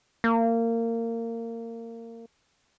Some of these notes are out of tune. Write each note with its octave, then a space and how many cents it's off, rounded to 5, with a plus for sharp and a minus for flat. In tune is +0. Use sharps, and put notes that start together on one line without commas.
A#3 -25